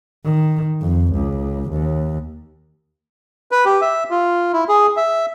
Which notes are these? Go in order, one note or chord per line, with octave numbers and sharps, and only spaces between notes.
D#3
F2
C#2
D#2
B4
G4
E5
F4
E4
G#4
E5